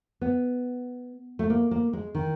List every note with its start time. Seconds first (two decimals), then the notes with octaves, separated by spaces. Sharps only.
0.21 B3
1.39 A3
1.50 A#3
1.71 A#3
1.93 G#3
2.15 D#3